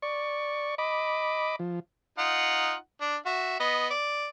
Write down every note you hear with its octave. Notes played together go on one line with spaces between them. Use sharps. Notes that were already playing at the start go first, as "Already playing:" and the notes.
D5 C#6
D#5 B5 D6
F3
D#4 F4 F#5
D4
F#4 E5
B3 D#5
D5